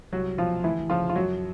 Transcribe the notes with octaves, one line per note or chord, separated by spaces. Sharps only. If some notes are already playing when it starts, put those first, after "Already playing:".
C2 F#3 F#4
B2 F3 F4
D2 E3 E4
C#3 E3 F3 F4
F4
F#2 F#3 F#4